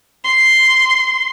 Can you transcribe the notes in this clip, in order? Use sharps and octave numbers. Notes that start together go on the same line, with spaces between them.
C6